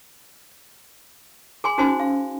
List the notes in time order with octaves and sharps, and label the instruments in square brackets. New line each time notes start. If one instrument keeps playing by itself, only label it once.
[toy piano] G#4 G#5 C6
C#4 D#4 F#4 C5 G#5 C6
F5